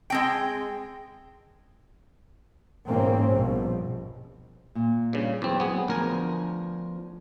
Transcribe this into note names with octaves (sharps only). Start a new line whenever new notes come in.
G#3 C4 G5
G#2 B2 E3 A#3 C4 C#4
A#1 G2 B2 F3
A#2
G2 C#3
E2 F#3 C4
F#3 G#3 B3 C4 G#4
D2 F3 B3 D4 A#4 G#5